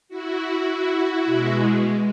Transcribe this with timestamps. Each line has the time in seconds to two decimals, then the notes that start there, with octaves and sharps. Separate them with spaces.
0.09 E4 F#4
1.24 B2 G#3